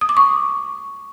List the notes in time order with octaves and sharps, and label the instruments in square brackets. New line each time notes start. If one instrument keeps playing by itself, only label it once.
[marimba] D#6
D6
C#6